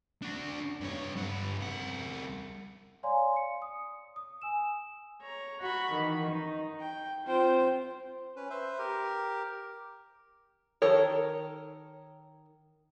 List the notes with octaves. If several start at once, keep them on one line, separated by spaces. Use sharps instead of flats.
D4 F#4
G2 C#5
G2 F#5
C2 F#5
C#5 D5 F5 G#5 A#5 C6
C#7
D#6
D#6
G#5 E6 E7
C#5 A#5
F#4 F#5 B5 C#6
D#3 E3
D#4
G5
C4 F4 C5 G5
C#4 B4
B4 C5 E5
G4 A#4
D#3 A4 A#4 C#5